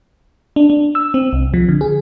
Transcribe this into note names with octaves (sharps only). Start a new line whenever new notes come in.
D4
D4
E6
C4
C2
F3
D3
G#4